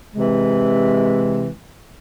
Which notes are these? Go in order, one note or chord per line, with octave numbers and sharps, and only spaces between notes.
C3 E3 G#3